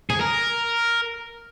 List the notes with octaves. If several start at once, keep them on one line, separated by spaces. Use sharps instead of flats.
G#4
A#4